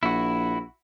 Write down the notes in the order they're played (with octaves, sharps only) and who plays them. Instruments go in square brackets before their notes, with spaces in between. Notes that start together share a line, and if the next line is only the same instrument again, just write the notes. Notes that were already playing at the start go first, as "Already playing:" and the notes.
[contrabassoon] A#1 [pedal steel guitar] E4 F#4